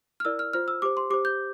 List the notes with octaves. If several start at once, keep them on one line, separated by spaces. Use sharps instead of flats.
F6
E4 A#4 D5 E6
F6
F4 C5 F6
E6
G4 C5 D6
C6
G4 C5 D6
G6